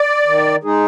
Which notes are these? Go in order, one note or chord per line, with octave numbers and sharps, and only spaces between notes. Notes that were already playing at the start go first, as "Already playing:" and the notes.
Already playing: D5
D#3
G#3 D#4 G#4